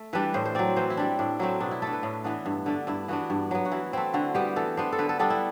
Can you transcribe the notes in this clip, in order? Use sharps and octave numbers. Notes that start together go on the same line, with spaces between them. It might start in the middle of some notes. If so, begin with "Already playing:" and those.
Already playing: A3
E3 G3 D4 B4
A2 C5
C5
F#3 C4 D5
E3 C5
E4
G3 D4
A2 D4
F#3 A3 C4 E4
B2 D4
E4
A3 D4 A4
B4
A2
E3 B3 D4
G2
D3 A3 D4
G2 E4
E3 B3 D4 F#4
G2
F#3 B3
F#4
E3 E4
A3 C4 E4
D3 F#4
G3 B3 G4
E3 A4
B3 D4 C5
A4
D3 B4
A4
G3 B3 D4 A4
E4